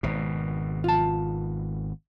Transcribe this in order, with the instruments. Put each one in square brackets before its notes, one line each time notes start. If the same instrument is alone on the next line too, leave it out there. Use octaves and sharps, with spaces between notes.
[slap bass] G#1 B2
[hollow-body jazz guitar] F4 A5